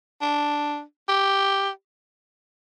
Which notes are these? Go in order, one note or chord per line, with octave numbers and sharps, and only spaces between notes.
D4
G4